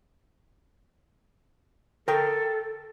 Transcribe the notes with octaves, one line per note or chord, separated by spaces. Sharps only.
A4 A#4 G5